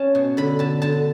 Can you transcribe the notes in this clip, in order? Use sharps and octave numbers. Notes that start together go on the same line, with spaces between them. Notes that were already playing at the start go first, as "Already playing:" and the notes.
Already playing: C#4 A5
B2
D3 B5
D3 A5
D3 A5